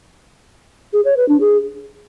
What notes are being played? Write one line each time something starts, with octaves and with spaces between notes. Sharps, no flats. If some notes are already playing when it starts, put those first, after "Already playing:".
G#4
C#5
B4
D4
G#4